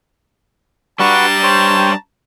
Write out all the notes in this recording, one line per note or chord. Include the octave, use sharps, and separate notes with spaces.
G3 D4 F#4 B4 A5 A#5 C#6
C5 C#5 G5